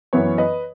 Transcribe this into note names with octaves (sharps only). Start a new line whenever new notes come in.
F#2 E3 B3 C#5 E5
B4 D#5